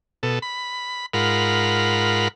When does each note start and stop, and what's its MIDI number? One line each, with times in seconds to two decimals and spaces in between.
0.23 0.39 47
0.23 0.39 69
0.42 1.06 83
1.13 2.28 44
1.13 2.28 65
1.13 2.28 70
1.13 2.28 78
1.13 2.28 83